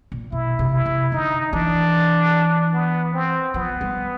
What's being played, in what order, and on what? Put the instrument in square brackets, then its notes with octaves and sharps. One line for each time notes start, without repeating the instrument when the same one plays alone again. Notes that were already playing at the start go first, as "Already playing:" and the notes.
[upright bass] A#2
[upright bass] B2 [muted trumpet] E4
[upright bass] C3
[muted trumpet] E4
[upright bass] C3
[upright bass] D3 [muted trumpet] D#4
[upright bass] E3 [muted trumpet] D4
[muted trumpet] B3
C4
[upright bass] F3 [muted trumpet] B3
[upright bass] G3